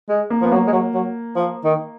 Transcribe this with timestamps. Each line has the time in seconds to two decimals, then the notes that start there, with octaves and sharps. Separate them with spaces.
0.09 G#3
0.30 A#3
0.42 F3 B3
0.52 F#3 A#3
0.67 G#3
0.72 F#3
0.94 F#3
1.36 F3
1.65 D#3